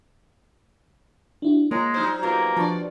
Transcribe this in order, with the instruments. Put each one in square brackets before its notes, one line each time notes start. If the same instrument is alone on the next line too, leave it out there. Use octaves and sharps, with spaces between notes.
[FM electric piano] D4 E4 F#4
[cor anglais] G#3 [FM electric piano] A#3 C#5 A#5 [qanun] F4
[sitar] F#3 D#4 C5 [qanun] D6 [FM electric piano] F6 G#6
[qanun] B2 F4 G4 [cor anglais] A#3
[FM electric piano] F3 A5 C#6 [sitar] D4 D5 [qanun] F4